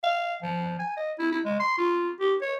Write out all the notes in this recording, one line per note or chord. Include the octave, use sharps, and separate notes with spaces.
F5
F3
G#5
D#5
E4
E4
G#3
C6
F4
G4
C#5